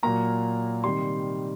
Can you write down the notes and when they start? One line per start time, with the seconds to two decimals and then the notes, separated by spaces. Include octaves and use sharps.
0.03 A#2 F#3 A#3 A#5
0.84 C3 D#3 G3 C6